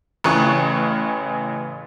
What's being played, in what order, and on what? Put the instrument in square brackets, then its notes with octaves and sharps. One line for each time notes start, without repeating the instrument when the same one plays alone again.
[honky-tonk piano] A1 C#3 E3 C#6 F#6